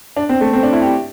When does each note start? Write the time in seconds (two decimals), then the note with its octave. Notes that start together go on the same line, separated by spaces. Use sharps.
0.16 D4
0.29 C4
0.41 A3
0.53 C4
0.63 D4
0.73 E4
0.82 G4